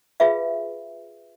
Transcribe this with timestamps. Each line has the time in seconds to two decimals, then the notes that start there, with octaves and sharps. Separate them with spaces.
0.20 F4 G#4 B4 E5 F5